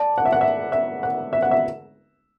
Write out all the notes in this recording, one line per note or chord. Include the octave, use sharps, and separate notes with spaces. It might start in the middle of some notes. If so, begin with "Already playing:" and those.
Already playing: D5 A5
F#5
E5
F#5
E5
E5
F#5
E5
F#5
E5